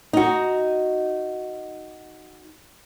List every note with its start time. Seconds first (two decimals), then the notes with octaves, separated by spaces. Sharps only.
0.13 D#4 F#4